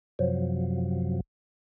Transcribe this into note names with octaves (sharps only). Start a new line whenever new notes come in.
F#2 C3 F3 F#3